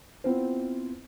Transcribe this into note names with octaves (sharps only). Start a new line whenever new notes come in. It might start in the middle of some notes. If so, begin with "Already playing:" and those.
B3 C4 E4 F4 C5